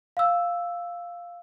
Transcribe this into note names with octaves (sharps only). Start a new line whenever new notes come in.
F5 E6